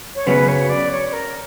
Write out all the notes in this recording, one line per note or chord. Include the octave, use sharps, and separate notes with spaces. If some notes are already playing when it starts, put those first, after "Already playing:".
C#5
F#2 C#3 F#3 B3 B4
C#5
D5
C#5
A#4